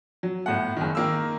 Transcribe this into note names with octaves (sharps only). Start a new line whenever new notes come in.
F#3
G1 A2 F#5
F#1 D#3
D#3 A#3 E6